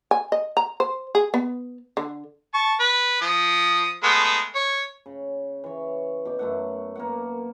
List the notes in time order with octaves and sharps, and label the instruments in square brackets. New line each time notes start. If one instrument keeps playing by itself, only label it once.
[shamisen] G#5
D#5
A#5
C5
G#4
B3
D3
[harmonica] A5 C#6
B4
F3 D#6
G#3 A3 B3
C#5
[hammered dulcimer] C#3
E3 C#5
B2 G5 D6
F#2 A3 F#5
A#3 B3 F#5